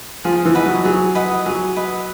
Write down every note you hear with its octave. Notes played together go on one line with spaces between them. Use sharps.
F3 G#4
E3
B4 D#5 F#5
F#3
F#3 G#4
B4 D#5 F#5
F#3 G#4
B4 D#5 F#5